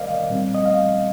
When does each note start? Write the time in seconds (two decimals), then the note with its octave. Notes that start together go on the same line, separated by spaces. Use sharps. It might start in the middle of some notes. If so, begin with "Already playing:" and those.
Already playing: C3 D#3 G3 A#4 C5 D5 D#5 F5
0.29 A#2 G3 C4
0.54 D#5
0.65 F5